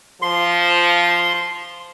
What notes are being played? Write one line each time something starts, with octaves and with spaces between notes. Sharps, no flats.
F3 C6